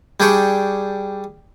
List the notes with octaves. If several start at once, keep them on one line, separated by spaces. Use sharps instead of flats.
G3 D4 G#4 G5 C#6